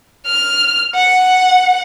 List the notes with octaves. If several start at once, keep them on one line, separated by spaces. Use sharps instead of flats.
F6
F#5